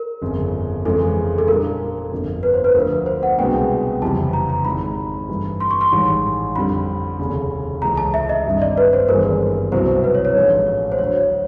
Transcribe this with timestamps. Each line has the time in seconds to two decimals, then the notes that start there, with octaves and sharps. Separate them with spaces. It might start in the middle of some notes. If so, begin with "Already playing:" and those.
Already playing: A#4
0.22 G1 F2 C#3
0.85 F2 C#3 E3 G#3 A4
1.38 A4
1.48 A#2 G3 A#3 D4 A#4
2.12 G1 F2 D3 F3 A#3
2.43 B4
2.54 C5
2.64 B4
2.75 D2 D3 F3 A3 A#4
3.06 C5
3.23 F#5
3.38 C2 B2 G#3 B3 D4 G5
4.02 F#1 F2 C3 E3 G3 A5
4.33 A#5
4.49 A#5
4.65 G#1 G#2 D#3 B5
5.29 G2 E3 A3 D4
5.60 C6
5.71 C#6
5.81 C6
5.92 A1 G#2 D#3 G3
6.55 F2 D3 G3 B5
7.19 F1 D#2 C#3
7.82 C#2 C3 E3 A3 A#5
7.97 A5
8.14 E5
8.29 D#5
8.45 G#1 G2 D3 G3
8.62 D5
8.78 B4
8.93 C5
9.09 G#1 G2 E3 G#3 B3 A#4
9.72 C2 B2 F#3 B3 E4 C5
10.04 B4
10.15 C#5
10.25 C#5
10.35 A1 G#2 F3 A3 D4
10.92 C5
10.98 D2 D3 F#3 C#5